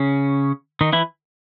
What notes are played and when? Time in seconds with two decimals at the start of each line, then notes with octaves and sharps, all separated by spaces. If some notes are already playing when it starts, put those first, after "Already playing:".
Already playing: C#3 C#4
0.81 D#3 D#4
0.93 E3 E4